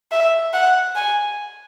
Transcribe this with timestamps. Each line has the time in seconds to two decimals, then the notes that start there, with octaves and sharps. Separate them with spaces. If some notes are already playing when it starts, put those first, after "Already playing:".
0.12 E5
0.54 F#5
0.96 G#5